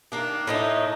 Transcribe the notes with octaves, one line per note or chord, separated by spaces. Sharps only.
D#3 A#3 D4
A2 A3 D#4